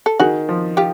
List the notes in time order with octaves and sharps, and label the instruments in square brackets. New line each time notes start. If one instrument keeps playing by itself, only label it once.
[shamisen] A4
[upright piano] D#3 [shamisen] F#4 G#4
[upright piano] F3
[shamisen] F4 G4